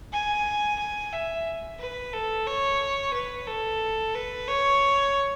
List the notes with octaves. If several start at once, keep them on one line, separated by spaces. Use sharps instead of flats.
G#5
G#5
E5
B4
A4
C#5
B4
A4
B4
C#5